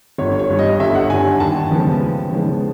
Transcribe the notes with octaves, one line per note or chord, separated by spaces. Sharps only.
G1 C#5
C#5
G2 D3 G3
D#5
G1 E5
F#5
G2 D3 G3 G#5
D#2 A5
C#3 F3 G#3 B3
D#2
C#3 F3 G#3 B3